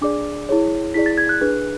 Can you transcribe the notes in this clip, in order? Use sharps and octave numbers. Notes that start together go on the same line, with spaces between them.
D4 G#4 D5 D6
E4 G#4 C#5
E4 G#4 D5 B6
A6
G#6
F#6
D4 G#4 B4